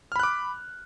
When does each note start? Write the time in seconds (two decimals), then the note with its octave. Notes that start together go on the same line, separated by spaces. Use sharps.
0.12 F6
0.16 B5
0.19 F#6
0.23 D6